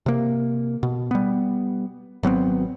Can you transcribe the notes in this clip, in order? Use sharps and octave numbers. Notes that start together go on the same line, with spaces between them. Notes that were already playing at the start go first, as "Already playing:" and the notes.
C3 A#3
B2
G3 B3
G#1 F#3 B3 C4